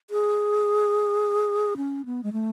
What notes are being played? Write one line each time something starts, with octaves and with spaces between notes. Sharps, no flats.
G#4
C#4
B3
G#3
A3